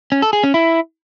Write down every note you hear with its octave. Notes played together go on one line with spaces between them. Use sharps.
C#4
A4
G#4
C#4
E4